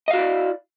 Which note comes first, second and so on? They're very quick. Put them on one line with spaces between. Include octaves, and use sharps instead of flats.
D#5 F5 F#4 E4 D5